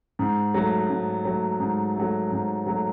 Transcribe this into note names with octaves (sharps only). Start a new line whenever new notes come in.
G#2
F#3 A3
G#2
F#3 A3
G#2
F#3 A3
G#2
F#3 A3